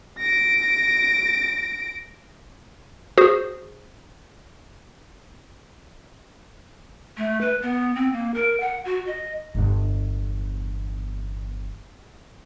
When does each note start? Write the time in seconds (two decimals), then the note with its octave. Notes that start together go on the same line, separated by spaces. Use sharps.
0.18 A#6 D7
3.18 F#4 G#4 C5
7.17 A3
7.41 B4
7.62 B3
7.95 C4
8.13 A#3
8.34 A#4
8.60 F#5
8.85 F#4
9.07 D#5
9.55 G1 E2